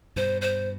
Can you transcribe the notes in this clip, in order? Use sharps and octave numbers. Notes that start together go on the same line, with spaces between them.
G2 B2 C5
C5